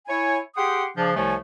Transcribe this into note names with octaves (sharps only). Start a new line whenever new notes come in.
E4 C#5 G#5
G4 G#4 F#5 G5 C6 D#6
C#3 F3 D4
C2 C3 F3 A3 C#5 G#5